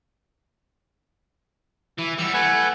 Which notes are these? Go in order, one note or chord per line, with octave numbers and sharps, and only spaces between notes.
E3 E4
G3 F#4 E6
A3 B4 F#5 G#5